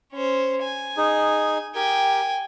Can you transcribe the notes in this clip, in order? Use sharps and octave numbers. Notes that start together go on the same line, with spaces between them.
C#4 C5
G#5
D#4 G#4
G4 A#4 G5 G#5